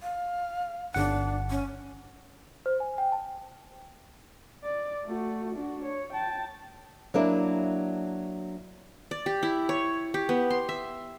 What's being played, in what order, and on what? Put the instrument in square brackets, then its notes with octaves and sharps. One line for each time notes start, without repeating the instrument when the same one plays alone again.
[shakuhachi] F5
[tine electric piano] G1 F#5 [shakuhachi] D4
[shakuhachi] C#4
[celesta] C5
G#5
G5
A5
[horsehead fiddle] D5
A3 F#4
D4 F#4
C#5
G5 A5
[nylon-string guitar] F#3 A#3 D4 E4
[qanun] D5
G4
E4
C#5
G4
B3
C6
E5